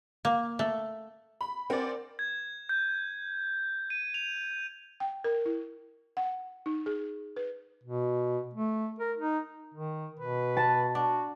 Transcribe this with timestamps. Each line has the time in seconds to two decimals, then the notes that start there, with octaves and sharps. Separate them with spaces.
0.25 A#3
0.59 A3
1.41 B5
1.70 C4 A#4 D5 F#5 G#5
2.19 G#6
2.69 G6
3.90 D#7
4.14 F7
5.00 G5
5.24 A#4
5.46 E4
6.17 F#5
6.66 D#4
6.86 G#4
7.36 B4
7.83 B2
8.54 A3
8.99 A#4
9.17 D#4
9.74 D#3
10.20 B2 B4
10.57 A5
10.95 D4 F#4